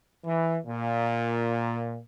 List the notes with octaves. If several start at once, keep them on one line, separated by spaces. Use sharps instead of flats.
E3
A#2